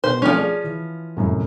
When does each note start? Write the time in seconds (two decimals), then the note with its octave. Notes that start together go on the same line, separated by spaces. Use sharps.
0.04 B2 C5
0.22 F3 A3 C4 C#4 A4
0.38 G#4 D5
0.64 E3
1.17 F1 F#2 A2